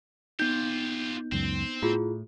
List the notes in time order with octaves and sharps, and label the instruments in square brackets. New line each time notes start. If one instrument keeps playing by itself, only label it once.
[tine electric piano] B3 D#4 [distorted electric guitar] F4 G4 [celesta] G6
[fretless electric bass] C#2 F#2 [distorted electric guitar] C4
[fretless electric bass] A2 [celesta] E4 F4 G#4